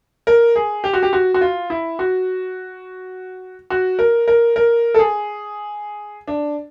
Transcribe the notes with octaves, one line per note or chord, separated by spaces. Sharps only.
A#4
G#4
G4
F#4
G4
F#4
F#4
F4
E4
F#4
F#4
A#4
A#4
A#4
A4
G#4
D4